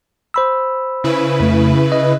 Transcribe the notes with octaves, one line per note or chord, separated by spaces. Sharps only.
C5 B5 E6
C#3 E4 B4
F2 A3
D#5